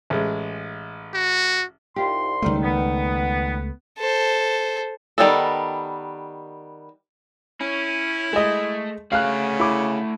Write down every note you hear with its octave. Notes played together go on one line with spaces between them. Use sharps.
A1 G#3
F#4
C2 D#4 F4 G4 C6
C#2 D#3 G3 A3
B3
A4 C5
D#3 G3 G#3 B3 A4
C#4 E4
G#3 A3 D#5
C#3 A3 F#4 F5 F#6
E4 D6